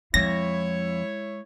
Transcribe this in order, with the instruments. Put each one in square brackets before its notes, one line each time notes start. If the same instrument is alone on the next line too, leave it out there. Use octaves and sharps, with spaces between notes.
[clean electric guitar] F2 [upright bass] G#3 [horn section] E4 C#5 [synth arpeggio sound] A#6